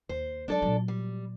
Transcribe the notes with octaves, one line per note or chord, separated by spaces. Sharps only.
D#2 C5
F#3 G#3 D4 A4 D5
A#2 F#3
G3